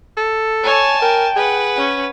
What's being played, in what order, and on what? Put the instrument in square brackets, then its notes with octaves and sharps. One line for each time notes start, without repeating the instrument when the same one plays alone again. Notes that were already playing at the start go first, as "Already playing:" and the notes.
[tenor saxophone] A4
[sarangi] C#5 [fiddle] G#5 A5
[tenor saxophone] A#4 [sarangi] G5
[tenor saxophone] G#4 [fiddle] B4 F#5
[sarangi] C#4